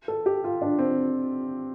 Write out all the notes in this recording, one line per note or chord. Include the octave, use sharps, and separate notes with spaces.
A4
G4
F4
D4
C4